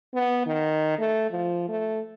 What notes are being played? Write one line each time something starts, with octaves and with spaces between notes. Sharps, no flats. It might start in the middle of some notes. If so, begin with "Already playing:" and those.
B3
D#3
A3
F3
A3